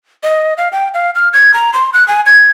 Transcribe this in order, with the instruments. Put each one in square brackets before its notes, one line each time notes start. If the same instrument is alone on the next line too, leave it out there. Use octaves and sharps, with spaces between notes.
[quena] D#5
F5
G5
F5
F6
G#6
A#5
C6
F#6
G#5
G#6